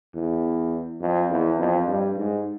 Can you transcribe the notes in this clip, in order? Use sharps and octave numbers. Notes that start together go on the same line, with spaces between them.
E2
F2
E2
F2
G2
G#2